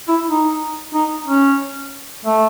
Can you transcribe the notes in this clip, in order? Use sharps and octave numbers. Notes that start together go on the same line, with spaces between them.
E4
D#4
D#4
C#4
A3